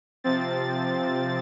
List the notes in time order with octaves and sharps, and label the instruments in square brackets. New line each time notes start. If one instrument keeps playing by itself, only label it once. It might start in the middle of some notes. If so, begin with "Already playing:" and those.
[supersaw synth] C3 F3 C4 A6